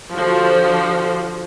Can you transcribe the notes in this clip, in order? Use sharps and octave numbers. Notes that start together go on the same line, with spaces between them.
D3 F3 F#4 G4 C5